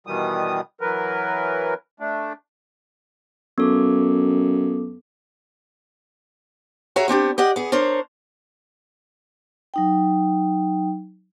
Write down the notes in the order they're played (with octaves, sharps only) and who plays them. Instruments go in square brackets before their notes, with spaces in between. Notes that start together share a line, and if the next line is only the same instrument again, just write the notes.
[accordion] B2 D#3 E3 G3 D#6
E3 F#3 A#4 B4
A3 D4
[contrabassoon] F#2 [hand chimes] B3 A4 D6
[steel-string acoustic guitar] F#4 G#4 C#5 E5 A#5
B3 C4 D4 G4
G4 D5 D#5 F#5
B3 G#4
D4 A#4 C5 C#5
[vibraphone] F#3 D#4 G5